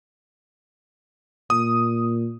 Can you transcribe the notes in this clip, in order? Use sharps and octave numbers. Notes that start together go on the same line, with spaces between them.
A#2 D#6